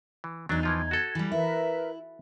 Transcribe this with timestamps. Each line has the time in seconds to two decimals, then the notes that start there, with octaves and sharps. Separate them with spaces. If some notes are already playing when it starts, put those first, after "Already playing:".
0.24 E3
0.49 E2 F#3 D4 D#4
0.63 E3 F3 F4 G#6
0.91 F#4 A4
1.15 E3 G3
1.32 E4 A#4 B4 E5